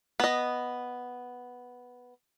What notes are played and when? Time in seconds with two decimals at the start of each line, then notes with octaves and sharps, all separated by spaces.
0.20 B3 D#5